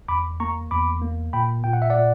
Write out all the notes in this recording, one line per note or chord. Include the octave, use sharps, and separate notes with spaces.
E2 B5 D6
A#3 A#5 C#6
E2 B5 D6
A#3
A#2 G5 B5
A#2 G5
F#5
E5
D5 F#5
A#2